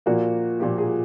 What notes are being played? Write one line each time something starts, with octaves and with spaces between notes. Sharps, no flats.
A#2 F3 A#3 F#4
A#2 F3 A#3 G4
G#4